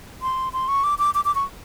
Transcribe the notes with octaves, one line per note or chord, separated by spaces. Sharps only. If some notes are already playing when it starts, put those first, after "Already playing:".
C6
C6
C#6
D6
D6
D6
D6
C#6